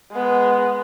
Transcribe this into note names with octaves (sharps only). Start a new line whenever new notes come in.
G#3 B3